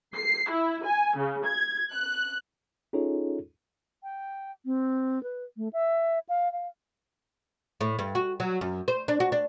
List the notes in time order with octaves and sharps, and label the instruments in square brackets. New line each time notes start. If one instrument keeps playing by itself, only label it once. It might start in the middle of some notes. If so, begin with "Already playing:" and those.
[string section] C7
E4
G#5
C#3
G#6
F#6
[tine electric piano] C#4 D#4 F4 G#4 A4 C#5
[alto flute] G5
C4
B4
A3
E5
F5
F5
[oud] A2
G2
F#4
F#3
F#2
C5
D4
F#4
D4